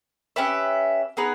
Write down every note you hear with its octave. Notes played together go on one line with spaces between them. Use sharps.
C#4 G4 B4 E5
B3 D#4 G#4 B4